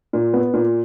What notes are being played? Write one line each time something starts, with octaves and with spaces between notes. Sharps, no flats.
A#2
B3
A#2